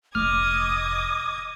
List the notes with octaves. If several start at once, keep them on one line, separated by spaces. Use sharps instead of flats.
F1 A#1 D#5 D6 D#6 F6 G#6